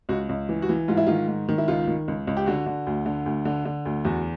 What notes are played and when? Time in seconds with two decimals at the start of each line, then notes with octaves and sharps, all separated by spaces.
0.09 C#2 F#4
0.29 C#2
0.49 E3
0.62 F#4
0.69 E3
0.88 G#2 F4
0.97 E4
1.07 D#3 F4
1.28 G#2
1.49 D#3
1.58 E4
1.68 C#2 F4
1.87 D#3
2.08 C#2
2.27 C#2
2.37 G4
2.46 D3 F#4
2.66 D3
2.87 D2
3.06 D3
3.26 D2
3.45 D3
3.65 D3
3.86 D2
4.05 E2 F#4